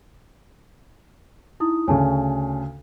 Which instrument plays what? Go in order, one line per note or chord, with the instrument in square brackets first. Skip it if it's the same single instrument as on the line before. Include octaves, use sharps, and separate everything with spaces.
[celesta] D#4 E4 D#6
[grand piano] D2 C#3 [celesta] C#5 G#5 A5